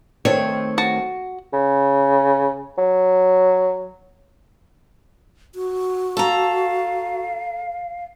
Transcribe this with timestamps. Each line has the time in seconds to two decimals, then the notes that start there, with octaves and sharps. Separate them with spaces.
0.25 D#3 A3 C4 C#5
0.78 F#4 A5
1.53 C#3
2.78 F#3
5.55 F#4
6.17 A4 F5 A#5